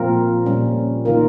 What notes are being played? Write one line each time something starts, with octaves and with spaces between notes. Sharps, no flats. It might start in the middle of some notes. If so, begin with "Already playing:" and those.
Already playing: A#2 F3 C4 F4 A#4
A#2 G3 C#4
D#3 A#3 F4 A#4